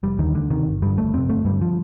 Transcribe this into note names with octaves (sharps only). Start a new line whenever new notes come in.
F1 G3
D#2 D3 D#3
D2 D3
C3 D#3
G1
G2 D3 G3
G1 A3
F2 C3 C4
G1 A3
G2 D3 G3
F3